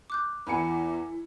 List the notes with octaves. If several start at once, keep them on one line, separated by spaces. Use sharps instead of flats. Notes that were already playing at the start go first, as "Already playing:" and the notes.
D6 F#6 G6
E2 E3 E4 A4 G#5 B5 C#7